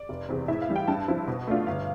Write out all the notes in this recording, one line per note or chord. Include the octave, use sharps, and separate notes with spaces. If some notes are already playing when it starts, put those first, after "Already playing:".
Already playing: D5
F1
E2 C3
A2 E5
F5
E3 G3
G5
G2 A5
F3 C4 E4
B2
A3 D4 F4
G1 F5